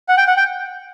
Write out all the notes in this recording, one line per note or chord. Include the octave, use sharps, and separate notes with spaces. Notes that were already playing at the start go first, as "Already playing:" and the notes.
F#5
G5
F#5
G5